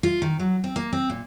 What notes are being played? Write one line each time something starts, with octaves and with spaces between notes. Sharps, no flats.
F4
D#3
F#3
C4
A#3
C4
A#2